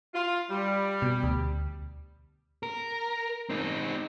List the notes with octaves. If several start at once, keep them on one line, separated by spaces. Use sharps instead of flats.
F4
G3
B2
D2
A#4
C4 D#4